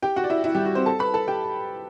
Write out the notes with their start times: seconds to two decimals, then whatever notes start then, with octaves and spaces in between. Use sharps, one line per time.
0.02 G4 G5
0.16 F#4 F#5
0.24 D5
0.30 E4 E5
0.44 E4 E5
0.54 G3 G4
0.65 F#4
0.75 C4 C5
0.86 A4 A5
0.99 B4 B5
1.14 A4 A5
1.28 G4 G5